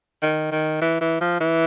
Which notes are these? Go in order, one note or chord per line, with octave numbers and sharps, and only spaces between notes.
D#3
D#3
E3
E3
F3
E3